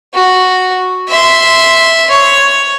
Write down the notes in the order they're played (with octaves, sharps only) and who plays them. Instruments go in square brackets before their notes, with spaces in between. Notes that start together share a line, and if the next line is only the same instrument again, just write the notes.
[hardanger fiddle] F#4
E5 C6
C#5